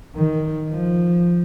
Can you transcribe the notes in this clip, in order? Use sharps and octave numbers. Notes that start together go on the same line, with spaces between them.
D#3
F3